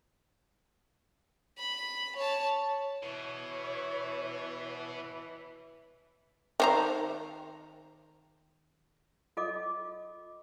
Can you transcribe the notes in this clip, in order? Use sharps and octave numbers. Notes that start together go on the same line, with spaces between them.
B5
C#5 A5
B2 E3 C#5
D#3 C5 A#5
F4 A4 D#5 D6